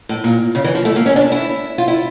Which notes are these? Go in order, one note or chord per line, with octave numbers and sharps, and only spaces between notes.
A2
A#2
C#3
E3
F3
A3
A#3
C#4
D4
E4
F4
E4